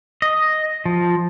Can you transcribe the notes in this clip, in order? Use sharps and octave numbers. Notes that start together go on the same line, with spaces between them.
D#5
F3